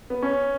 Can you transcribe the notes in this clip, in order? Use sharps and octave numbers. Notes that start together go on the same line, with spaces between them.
B3
C#4